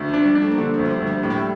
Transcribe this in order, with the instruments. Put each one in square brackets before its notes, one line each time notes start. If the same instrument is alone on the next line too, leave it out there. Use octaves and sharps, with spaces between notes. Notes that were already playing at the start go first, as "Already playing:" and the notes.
Already playing: [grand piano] D2
[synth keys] F3
[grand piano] D4
[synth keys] G3
[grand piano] D4
[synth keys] A3
A#3
[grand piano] D3 [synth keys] A3
[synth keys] F3
[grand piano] D2
[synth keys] F3
G3
[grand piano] D2
[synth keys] G3
[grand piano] A2 [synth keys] A#3
[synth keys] G3
A3